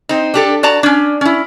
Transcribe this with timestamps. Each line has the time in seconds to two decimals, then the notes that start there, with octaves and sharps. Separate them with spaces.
0.09 C4 D#4
0.34 D4 G4 A4
0.63 F#4 D5 A5 A#5
0.83 C#4 D4
1.21 C#4 E4